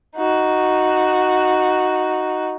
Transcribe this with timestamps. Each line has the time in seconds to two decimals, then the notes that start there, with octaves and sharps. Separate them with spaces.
0.16 D#4 F#4